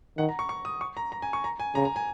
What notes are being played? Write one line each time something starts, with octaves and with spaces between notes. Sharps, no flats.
D#3 F#5
A#5
C#6
C#6
D#6
C#6
A#5
A#5
G#5
C#6
A#5
G#5
C#3 A#5
A#5
G#5